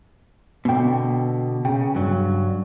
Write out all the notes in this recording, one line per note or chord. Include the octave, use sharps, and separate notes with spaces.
B2 D3 B3 G5
C#3 G5
G2 F#3